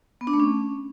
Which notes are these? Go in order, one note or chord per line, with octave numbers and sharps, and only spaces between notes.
B3
D4
A3
C#4